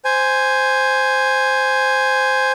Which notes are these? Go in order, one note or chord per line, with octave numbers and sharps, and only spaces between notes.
C5 G#5